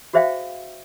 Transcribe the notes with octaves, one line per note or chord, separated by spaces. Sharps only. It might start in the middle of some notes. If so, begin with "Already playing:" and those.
F#4 G#4 C5 E5 F5 G5